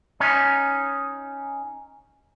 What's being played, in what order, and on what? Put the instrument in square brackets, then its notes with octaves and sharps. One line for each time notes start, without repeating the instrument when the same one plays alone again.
[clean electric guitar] C#4 D#4